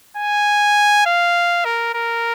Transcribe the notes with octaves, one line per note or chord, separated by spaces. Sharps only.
G#5
F5
A#4
A#4